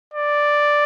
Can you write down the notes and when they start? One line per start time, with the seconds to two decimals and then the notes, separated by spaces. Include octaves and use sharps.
0.14 D5